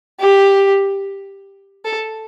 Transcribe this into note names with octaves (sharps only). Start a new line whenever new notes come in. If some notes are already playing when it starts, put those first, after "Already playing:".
G4
A4